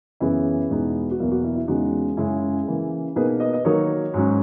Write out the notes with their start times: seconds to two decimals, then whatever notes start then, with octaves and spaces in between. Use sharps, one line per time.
0.20 F#2 C#3 E3 B3 E4 G#4
0.70 E2 B2 G#3 B3 D#4
1.11 F#4
1.19 E2 B2 F#3 A#3 E4
1.31 F#4
1.44 E4
1.55 E4
1.68 E2 C#3 G#3 D#4 F#4
2.17 F#2 C#3 G#3 E4 G#4
2.67 C#3 E3 A#3
3.16 B2 A#3 D#4 G#4 B4
3.40 B4 D#5
3.53 B4 D#5
3.65 D#3 F#3 A#3 D#4 A#4 C#5
4.14 G#2 F#3 C#4